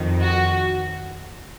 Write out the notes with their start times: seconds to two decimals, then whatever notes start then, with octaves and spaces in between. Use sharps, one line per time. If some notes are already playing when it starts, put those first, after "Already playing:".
Already playing: F2 D#3
0.20 F#4